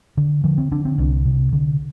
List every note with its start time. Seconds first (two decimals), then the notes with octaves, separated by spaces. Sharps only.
0.17 D3
0.44 D3 F3
0.58 C4
0.71 D3 D4
0.85 C4
0.98 C2 D4
1.25 C3
1.53 D3